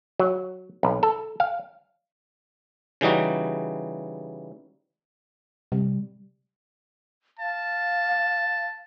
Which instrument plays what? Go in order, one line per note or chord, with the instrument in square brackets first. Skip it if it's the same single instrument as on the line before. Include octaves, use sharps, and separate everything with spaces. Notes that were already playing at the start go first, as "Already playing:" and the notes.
[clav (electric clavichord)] F#3
B1
A4
F5
C#3 E3 G3 D#4 F#4
[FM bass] C3 [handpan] G3
[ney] F5 [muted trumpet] A5